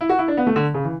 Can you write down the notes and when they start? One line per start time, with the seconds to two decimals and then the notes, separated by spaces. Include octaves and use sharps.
0.01 E4
0.09 F#4
0.19 E4
0.28 D4
0.37 B3
0.47 A3
0.56 D3
0.74 C#3
0.84 E3